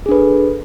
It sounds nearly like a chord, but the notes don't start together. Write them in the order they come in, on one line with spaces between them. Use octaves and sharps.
G#4 D4 B4 A4